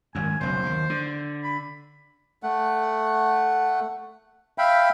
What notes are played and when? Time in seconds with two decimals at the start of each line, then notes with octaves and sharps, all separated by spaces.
0.15 G#1 F#2 G#5
0.41 F#1 B1 F#2 C5
0.67 D#2
0.90 D3
1.43 B5
2.43 A3 F#5
4.58 E5 F5 G5 B5